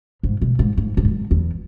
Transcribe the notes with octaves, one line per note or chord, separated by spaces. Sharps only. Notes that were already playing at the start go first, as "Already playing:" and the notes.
G#2
B2
G#2
G#2
G#2
F#2
E2